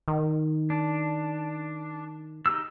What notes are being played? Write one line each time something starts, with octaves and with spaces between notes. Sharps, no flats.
D#3
D4
D#4 G4 E6